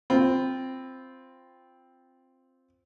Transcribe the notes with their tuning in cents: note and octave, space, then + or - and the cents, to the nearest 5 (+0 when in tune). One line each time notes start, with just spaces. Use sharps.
C4 +0 F4 +0 B5 +15